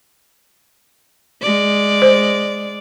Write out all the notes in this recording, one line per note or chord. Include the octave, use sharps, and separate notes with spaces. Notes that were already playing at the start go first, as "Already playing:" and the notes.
G#3 D5
C5